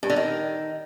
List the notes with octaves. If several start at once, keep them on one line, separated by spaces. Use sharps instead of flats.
G2
D3
D#3